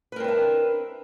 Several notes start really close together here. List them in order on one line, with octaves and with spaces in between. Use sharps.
B4 A#4 C4 D4 E5